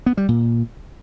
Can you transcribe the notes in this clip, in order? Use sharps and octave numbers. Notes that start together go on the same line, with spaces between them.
B3
G3
A#2